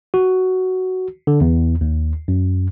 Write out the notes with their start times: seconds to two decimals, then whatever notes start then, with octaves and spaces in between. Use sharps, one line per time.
0.14 F#4
1.27 D3
1.41 E2
1.81 D#2
2.28 F#2